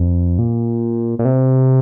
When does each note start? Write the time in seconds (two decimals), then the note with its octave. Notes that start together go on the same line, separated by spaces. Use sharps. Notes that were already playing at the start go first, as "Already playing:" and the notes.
Already playing: F2
0.39 A#2
1.19 A#2
1.25 C3